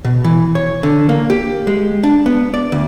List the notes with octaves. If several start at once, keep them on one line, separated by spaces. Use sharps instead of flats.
B2
E3
C#5
D3
A#3
G4
G#3
D4
B3
D5
D2